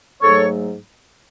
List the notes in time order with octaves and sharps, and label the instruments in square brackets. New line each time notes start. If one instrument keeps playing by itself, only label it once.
[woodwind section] G#2 F#3 A3 A4 C#5